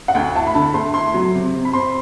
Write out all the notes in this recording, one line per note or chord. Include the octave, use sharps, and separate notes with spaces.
F#5
D2 G5
E4 A5
B5
D3 A5
A3 C6
E4 C6
F#3
C3
C3
B5
C4 C6